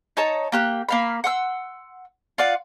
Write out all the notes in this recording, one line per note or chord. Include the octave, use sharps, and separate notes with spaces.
D#4 C#5 A5 A#5
A#3 G4 F#6
A#3 F5 B5
F#5 C6 E6
F4 D5 F5 F#5